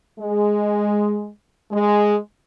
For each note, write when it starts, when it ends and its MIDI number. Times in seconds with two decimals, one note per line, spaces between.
0.20 1.29 56
1.72 2.17 56